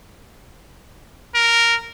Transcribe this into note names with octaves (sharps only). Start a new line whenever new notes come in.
A#4